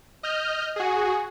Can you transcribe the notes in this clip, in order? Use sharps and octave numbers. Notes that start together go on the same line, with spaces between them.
D#5 F6 G6
F#4 G#4